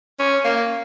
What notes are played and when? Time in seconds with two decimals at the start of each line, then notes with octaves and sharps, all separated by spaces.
0.19 C#4
0.44 A#3